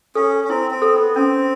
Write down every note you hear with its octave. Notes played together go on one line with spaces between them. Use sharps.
C#4 A4
C#4
C4 E4
C4
A4
B3
C4 C#4